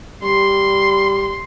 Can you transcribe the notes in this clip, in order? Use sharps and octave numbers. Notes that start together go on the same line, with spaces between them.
G3 C6